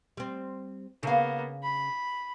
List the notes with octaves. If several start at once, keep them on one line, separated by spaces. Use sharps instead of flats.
G3 C4
C#3 A#3 B3 F5
B5